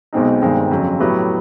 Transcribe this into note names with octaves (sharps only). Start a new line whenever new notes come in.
B1 B2 G#3 C4 D#4
G1 G2 D#3 G#3 C4
F2 C#3 F#3
A2 F#3 B3 E4 G4